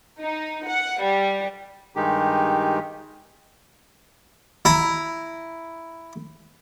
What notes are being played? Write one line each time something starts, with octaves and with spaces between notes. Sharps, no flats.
D#4
F#5
G3
G2 D#3 G#3 D#4 G4
E4 A#5